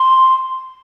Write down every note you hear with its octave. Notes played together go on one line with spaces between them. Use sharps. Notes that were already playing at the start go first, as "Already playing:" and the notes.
Already playing: C6